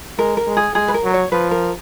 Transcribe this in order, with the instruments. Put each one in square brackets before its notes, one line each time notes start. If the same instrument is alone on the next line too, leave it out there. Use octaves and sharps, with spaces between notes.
[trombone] G#3 [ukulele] A#4
[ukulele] A#4
[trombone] G#3
[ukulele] G#4
[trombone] G#3 [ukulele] G#4
[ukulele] B4
A#4
[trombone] F#3
[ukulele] C#5
[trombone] F3 [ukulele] B4
[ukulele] A#4